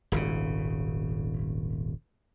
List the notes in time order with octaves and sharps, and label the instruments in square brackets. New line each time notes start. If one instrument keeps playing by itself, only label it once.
[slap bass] D#1 G#1 C#3